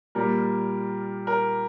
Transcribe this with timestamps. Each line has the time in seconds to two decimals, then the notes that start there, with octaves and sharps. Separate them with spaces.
0.15 A#2 G3 A#4
1.27 A#4